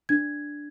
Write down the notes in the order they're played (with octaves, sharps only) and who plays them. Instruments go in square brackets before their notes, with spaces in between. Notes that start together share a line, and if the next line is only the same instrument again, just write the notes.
[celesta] D4 G#6